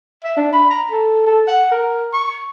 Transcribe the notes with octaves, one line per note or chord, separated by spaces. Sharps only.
E5
D4
B5
A#5
A4
A4
F#5
A#4
C#6